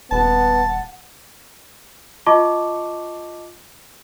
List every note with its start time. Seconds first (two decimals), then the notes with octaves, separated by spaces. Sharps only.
0.12 D#1 B3 F#5 A5
2.26 F4 D#5 A5 C#6 D6